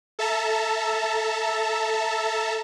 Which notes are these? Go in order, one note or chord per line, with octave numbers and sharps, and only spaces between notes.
A4 E5 A5 A#5